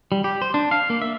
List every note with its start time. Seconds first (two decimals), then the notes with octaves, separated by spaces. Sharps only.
0.12 G3
0.24 G4
0.42 C5
0.54 D4
0.71 F5
0.90 A#3
1.02 E5